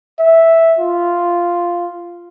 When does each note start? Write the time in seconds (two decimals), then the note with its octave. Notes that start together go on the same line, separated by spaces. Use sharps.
0.19 E5
0.79 F4